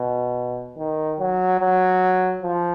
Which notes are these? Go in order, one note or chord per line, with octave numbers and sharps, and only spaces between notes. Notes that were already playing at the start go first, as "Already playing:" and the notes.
Already playing: B2
D#3
F#3
F#3
F3